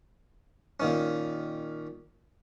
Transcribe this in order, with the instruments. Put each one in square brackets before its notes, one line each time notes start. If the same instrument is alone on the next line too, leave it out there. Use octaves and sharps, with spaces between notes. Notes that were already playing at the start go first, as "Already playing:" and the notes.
[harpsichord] A#2 D#3 C#4